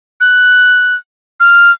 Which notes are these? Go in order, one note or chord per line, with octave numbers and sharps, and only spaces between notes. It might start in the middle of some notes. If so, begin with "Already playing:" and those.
F#6
F6